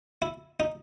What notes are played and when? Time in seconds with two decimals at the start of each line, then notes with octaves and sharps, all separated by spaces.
0.22 E4
0.60 D#4